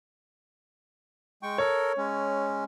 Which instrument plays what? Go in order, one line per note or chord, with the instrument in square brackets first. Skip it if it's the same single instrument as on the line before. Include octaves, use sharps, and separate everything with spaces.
[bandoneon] G#3 G5 C#6
[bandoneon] A4 A#4 [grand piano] C#5
[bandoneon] G#3 C#4